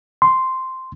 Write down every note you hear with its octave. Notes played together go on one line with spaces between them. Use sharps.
C6